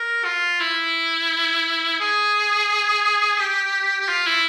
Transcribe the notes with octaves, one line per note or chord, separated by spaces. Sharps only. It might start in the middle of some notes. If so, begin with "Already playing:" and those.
Already playing: A#4
F4
E4
G#4
G4
G4
F4
E4